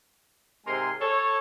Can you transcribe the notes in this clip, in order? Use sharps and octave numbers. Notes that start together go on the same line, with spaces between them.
G#2 C3 G#3 A#4 G#5 C6
A4 C#5